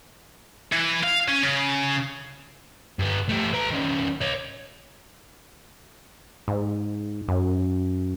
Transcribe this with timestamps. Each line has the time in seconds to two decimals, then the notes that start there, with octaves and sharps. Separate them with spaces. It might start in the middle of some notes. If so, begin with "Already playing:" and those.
0.73 E3
1.04 F5
1.28 C#4
1.43 C#3
2.99 G2 B3
3.29 A3 G4
3.53 B4 A#5
3.70 D#3 C#4
4.22 C#5 D#5
6.48 G#2
7.28 F#2